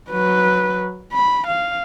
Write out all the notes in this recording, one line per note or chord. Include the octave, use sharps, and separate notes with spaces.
F#3 B4
B5
F5